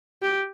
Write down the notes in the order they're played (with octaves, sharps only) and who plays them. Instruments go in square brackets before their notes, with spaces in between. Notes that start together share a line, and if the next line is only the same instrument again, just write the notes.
[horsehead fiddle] G4